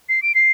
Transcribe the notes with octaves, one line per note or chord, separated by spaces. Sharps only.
C7
D7
C7